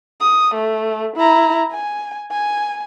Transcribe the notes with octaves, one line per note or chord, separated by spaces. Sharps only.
D#6
A3
E4 A#5
G#5
G#5